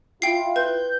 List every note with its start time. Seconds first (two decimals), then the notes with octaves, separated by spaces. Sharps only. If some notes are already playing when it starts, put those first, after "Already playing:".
0.22 E4 F4 G5 C7
0.56 B4 G6